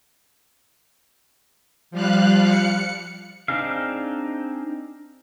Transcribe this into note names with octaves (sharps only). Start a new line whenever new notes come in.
F3 G3 F5 F#6
C#7
C4 D4 D#4 G#4 F5